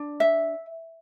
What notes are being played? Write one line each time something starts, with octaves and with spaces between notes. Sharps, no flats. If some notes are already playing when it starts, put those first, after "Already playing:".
Already playing: D4
E5